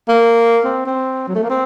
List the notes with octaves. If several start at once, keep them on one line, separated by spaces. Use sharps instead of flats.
A#3
C4
C4
F#3
A3
A#3
C4